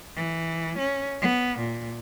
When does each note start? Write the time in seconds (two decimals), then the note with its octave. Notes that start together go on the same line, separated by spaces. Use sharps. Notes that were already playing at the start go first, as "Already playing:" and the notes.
0.16 E3
0.78 C#4
1.22 B3
1.58 A#2